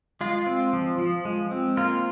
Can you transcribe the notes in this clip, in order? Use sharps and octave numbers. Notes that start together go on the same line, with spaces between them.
G#3 F4
C4
F3
F3
G#3
C4
A#3 F4